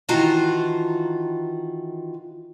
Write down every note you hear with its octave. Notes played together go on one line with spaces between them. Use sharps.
D#3 E3 F4 F#4 A5 A#5